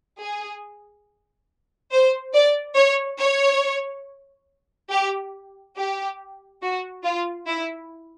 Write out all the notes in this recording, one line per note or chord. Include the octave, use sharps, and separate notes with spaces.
G#4
C5
D5
C#5
C#5
G4
G4
F#4
F4
E4